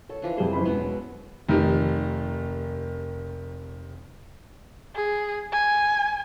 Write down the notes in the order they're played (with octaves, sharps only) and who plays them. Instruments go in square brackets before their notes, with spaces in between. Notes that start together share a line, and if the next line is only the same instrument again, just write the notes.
[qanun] A4 [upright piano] C#5
[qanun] E3 F3 D4
[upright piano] F2 G3 G#3 [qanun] G#4 C5
[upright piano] F#1 B5
[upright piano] E1 [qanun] B2 F#3 B3
[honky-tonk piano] F1 D#3 G4
[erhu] G#4
G#5